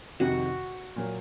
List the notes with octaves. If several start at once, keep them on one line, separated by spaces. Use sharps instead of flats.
F2 C3 D#3 F#4
A#2 F#3 A#3